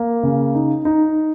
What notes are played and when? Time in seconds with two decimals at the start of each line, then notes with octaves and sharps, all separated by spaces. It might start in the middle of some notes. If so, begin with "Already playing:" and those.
Already playing: A#3
0.23 C#3
0.54 D#4
0.85 D#4